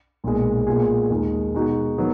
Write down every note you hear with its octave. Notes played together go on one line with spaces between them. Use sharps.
B1 A#2 G#3
A#2 G#3 B3 F4 G#4
D#2 D#3 G#3
B2 G#3 D#4 F#4
D#3 F#3 B3